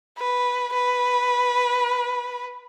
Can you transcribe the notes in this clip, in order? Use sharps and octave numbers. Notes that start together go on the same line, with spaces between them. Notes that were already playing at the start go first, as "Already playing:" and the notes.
B4
B4